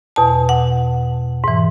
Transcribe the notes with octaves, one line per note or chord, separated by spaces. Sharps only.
E2 B2 A5
F#5
G#2 E3